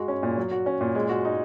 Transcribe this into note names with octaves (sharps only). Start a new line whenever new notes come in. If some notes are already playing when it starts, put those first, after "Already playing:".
Already playing: G#3 F#4
C#4
A#2
F#3
F#4
C#4
A#2
G#3
F#4
D#4